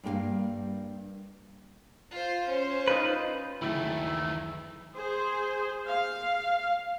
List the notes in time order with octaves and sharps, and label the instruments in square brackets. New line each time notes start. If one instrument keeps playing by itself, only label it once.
[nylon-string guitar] G2 G3 A#3 G#4 A#4 F5
[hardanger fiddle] F4 C5
[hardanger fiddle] C#4 [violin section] C5
[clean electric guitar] D#4 F4 B4
[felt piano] F#1 D2 B5 [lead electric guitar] D#3 E3 [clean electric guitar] A3 [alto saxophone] E4
[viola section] G#4 C5
F5